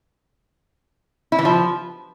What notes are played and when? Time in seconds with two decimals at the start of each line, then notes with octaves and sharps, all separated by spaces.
1.32 E4
1.39 E3
1.45 F3